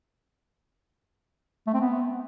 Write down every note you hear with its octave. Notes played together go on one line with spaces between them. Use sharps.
A3
C4
B3